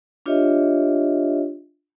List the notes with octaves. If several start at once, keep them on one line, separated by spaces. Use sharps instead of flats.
D4 F4 G4 C#5 D#5 E5